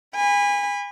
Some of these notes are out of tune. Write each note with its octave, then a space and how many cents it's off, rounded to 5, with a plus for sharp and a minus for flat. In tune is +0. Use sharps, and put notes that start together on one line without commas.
G#5 -30 B5 +0